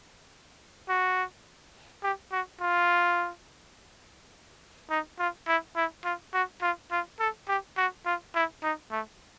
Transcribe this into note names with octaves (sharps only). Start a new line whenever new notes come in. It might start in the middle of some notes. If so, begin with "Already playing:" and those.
F#4
G4
F#4
F4
D#4
F4
E4
E4
F4
F#4
F4
F4
A4
G4
F#4
F4
E4
D#4
A3